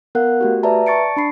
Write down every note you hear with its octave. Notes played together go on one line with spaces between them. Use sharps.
B3 A#4 F5 F#5 F#6
A3 F#4 G4
B4 D5 E5 A5 A#5
D5 A5 C#6 A6 C#7 D7
D4 B5 C7